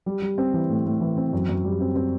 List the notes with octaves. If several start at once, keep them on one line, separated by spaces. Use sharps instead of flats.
G3
G3
C4
E3
A2
A2
E3
C4
F#2
F#2
G3
C4
C4